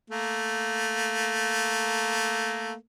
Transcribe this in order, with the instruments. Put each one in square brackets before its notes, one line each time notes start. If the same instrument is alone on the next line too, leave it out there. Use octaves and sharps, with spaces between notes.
[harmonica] A3 A#3